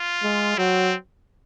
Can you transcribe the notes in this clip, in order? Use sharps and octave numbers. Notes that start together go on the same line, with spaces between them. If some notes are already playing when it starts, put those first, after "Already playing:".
Already playing: F4
G#3
F#3 C4